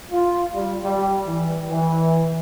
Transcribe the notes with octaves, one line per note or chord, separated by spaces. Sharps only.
F4
G3
G3
E3
E3